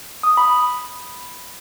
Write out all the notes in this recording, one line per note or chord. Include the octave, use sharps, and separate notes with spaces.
D#6
B5